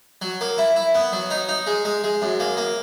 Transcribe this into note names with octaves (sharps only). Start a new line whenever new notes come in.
F#3
A#3
E4
E4
B3
F#3
D#4
D#4
G#3
G#3
G#3
F#2
A#3
A#3